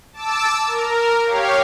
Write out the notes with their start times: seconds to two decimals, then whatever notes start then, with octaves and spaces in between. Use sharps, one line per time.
0.13 A5 D6 E6
0.67 A#4
1.24 G4 C#5 F5